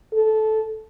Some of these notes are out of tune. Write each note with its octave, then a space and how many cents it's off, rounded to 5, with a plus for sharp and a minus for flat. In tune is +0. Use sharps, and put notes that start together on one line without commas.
A4 -15